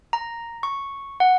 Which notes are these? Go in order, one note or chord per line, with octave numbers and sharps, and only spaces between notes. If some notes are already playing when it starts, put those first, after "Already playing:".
A#5
C#6
F#5